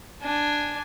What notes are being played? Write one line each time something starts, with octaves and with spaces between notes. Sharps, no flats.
D4 G#5